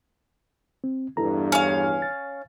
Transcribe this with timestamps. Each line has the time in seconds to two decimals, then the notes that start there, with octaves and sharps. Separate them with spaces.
0.84 C4
1.17 E2 G2 E4 A4 A#5
1.52 C#4 F5
2.02 A6